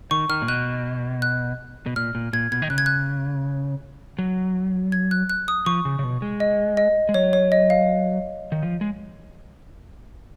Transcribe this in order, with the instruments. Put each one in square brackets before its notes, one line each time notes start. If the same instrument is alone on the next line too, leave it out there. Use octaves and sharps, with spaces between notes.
[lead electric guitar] D#3 [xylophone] C#6
[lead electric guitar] D#3 [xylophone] F6
[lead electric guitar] A#2
[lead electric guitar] B2 [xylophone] F#6
[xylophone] F#6
[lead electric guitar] B2
[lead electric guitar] A#2 [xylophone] F6
[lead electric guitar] A#2
[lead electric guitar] A#2 [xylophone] G#6
[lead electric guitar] B2 [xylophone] G#6
[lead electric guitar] D#3
[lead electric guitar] C#3 [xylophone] F#6
[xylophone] G#6
F#6
[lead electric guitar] F#3
[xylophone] G#6
F#6
F#6
D#6
[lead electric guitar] F3 [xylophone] C#6
[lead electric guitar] C#3
C#3
B2
G#3
[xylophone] D#5
D#5
[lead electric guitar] G#3
[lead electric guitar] F#3 [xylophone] C#5
[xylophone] C#5
D#5
F5
[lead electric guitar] D#3
F3
G#3